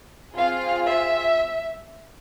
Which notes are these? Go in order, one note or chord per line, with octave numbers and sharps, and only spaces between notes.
C4 F4 G#4 F5
E5